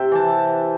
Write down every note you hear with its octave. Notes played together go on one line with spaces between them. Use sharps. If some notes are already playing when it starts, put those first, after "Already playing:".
Already playing: C3 C4 E5 G5
E3 A5